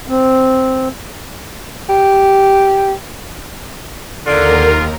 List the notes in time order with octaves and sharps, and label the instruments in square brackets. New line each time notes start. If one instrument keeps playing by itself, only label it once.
[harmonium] C4
[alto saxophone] G4
[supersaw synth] D#2 [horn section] D3 [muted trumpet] F4 [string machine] A#4